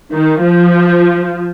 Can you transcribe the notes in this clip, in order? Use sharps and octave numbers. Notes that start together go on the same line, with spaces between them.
D#3
F3